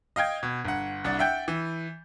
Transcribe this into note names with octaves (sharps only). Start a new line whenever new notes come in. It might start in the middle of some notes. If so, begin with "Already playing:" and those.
D#5 F5 G5 G#6
B2
G1 F#5
C2 D4 F#5 A6
E5 F#5 G5 G6
E3